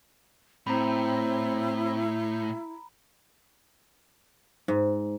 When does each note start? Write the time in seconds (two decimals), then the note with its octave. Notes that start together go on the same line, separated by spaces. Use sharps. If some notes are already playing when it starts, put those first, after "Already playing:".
0.67 A2 C4 E4 A#5 B5
4.68 G#2